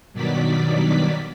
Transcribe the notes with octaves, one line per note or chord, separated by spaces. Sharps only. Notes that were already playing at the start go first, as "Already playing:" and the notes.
G2 B2 D#3 F#3 D5 B6